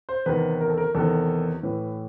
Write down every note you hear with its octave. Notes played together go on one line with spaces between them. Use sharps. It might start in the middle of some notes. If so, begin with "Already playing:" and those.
C5
E2 C3 D#3 B4
A#4
A4
A#4
E2 C3 D#3 A4
A2 E3 B4